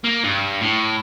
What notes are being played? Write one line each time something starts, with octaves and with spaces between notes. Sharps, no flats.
A#3
G2
A2